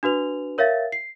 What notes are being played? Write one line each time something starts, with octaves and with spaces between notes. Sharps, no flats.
D4 F#4 B4 F7
A#4 C#5 E5 F5 A6
C7